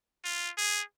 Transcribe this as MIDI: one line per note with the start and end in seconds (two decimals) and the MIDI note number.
0.24 0.50 65
0.58 0.82 68